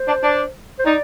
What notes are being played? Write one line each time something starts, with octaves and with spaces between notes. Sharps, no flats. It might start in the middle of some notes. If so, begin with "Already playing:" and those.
Already playing: C5
D4
D4
C5
D#4 D5